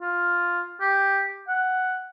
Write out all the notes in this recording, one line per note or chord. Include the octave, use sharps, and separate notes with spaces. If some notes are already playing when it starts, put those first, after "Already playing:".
F4
G4
F#5